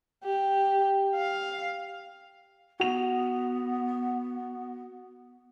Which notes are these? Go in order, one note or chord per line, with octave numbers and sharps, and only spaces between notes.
G4
F5
B3 F#4 F7